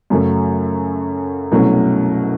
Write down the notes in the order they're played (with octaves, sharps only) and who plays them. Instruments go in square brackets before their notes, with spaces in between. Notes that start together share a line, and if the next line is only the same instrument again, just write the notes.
[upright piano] F#2 C#3 F#3 A3 C#4
C2 B2 F#3 A3 C#4